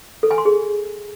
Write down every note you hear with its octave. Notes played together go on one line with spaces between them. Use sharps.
A4
G#5
C6
G#4